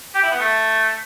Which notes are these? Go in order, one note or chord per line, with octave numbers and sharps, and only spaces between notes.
G4
E4
B3
A3